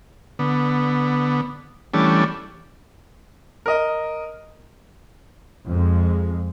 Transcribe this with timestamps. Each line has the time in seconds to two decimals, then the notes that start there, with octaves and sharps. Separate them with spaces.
0.39 D3 B3
1.94 E3 G3 A3 C#4 D4
3.66 A#4 D#5
5.66 F2 G#3